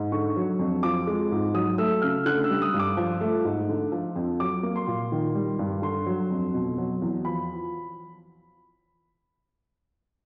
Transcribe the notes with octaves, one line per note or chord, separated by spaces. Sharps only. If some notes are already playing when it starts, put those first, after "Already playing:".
Already playing: G#2
D3 C#6
F#3
F2
F3 D6
G#3
G#2
F#3 D#6
A3 E6
C#3 F6
D3 F#6
E6
G3
D#6
G2
D6
F3
A3
G#2
D3
F3
F2
F#3 D6
A#3
C6
A#2
D#3
G3
G2
D3 C6
F#3
F2
B2
F#3
E2
F3 B5